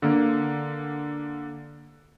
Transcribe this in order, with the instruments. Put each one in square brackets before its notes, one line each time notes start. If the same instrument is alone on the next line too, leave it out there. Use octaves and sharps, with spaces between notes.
[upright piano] D3 A#3